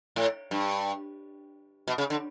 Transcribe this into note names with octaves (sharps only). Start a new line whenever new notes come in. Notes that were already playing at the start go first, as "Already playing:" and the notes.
A2
G2
B2
C#3
D3